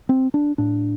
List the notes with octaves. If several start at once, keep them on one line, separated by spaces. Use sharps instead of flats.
C4
D4
A2 D4